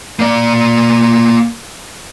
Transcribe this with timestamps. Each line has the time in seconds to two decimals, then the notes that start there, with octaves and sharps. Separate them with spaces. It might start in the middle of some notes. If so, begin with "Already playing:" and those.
0.19 A#3 D5